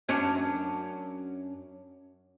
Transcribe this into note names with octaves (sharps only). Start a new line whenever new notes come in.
F#2 C#4 D4